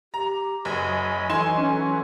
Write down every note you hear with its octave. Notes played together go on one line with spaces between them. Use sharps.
G4 A#5
F#1 F#3 D#5 G#5 B5
E3 F#3 D#4 A4 G#5 C6 E7
C#4